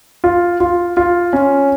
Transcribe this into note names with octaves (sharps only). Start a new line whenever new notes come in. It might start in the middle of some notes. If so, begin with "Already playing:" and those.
F4
F4
F4
C#4